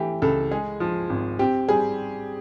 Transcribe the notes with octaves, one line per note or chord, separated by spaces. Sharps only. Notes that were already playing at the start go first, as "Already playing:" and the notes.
Already playing: E3 A3 G4
C#2 A4
G#3 G#4
F3
G#1
C4 G4
G3 G#4